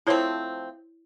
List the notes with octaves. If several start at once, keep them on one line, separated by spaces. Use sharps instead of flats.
F3 A3 C4 E4 C#5